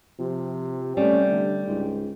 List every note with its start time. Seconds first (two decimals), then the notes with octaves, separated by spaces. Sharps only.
0.20 C3 F3
0.97 C3 G3 A3 C#4
1.30 D3
1.67 C#2 G#2